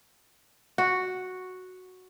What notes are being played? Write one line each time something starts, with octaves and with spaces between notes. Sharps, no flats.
F#4